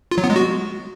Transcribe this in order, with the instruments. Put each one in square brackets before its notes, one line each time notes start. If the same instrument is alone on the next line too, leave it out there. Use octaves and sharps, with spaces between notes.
[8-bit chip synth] F4
F#3
B3
G#3
F#4